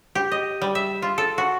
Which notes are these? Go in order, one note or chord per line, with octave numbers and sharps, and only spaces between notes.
G4
D#5
G3
E5
F4
A4
F#4